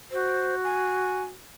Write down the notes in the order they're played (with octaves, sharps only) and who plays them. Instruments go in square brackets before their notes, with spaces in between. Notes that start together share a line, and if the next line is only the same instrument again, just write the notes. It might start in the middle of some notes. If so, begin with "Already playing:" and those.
[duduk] F#4 [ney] C5
[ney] G#5